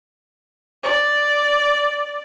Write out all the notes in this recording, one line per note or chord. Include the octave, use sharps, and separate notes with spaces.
D5